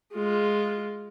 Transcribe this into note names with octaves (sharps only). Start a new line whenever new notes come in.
G#3 F4